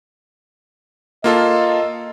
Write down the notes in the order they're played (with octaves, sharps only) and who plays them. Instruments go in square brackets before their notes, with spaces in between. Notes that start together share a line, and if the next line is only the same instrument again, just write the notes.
[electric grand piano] A#3 F4 A4 [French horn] D#5